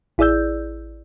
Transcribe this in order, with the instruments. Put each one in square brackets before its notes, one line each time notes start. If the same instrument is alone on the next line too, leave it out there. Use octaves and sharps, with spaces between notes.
[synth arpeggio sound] A1 E4 G#4 D5 E6 G6